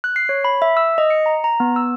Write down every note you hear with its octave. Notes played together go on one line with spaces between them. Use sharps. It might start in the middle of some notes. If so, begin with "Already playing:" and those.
F#6
C7
C#5
B5
E5
E6
D#5
C#7
A#5
A#5
B3
E6